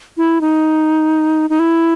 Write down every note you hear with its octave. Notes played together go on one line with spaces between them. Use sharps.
E4
D#4
D#4
E4